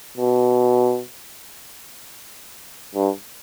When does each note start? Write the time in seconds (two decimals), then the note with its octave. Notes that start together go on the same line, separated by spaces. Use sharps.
0.17 B2
2.95 G2